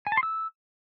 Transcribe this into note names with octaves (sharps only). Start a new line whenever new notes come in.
G#5
A5
C6
E6